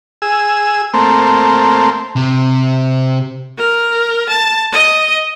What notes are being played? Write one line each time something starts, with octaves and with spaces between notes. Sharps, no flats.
G#4 E6
A3 A#3 C4
C3
A#4
A5
D#5